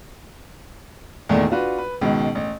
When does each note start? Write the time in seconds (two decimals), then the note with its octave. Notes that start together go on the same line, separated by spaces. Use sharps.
1.29 E2 A#2 D#3 A3
1.51 D4 F4 F#4 B4
1.78 B4
2.01 C#2 B2 D#3
2.35 A1